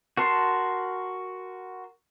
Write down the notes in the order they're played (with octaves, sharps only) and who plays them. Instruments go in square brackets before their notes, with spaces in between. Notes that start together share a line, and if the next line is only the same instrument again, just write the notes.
[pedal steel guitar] F#4 A#4 A5 C6